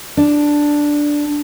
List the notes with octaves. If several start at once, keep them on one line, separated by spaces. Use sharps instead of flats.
D4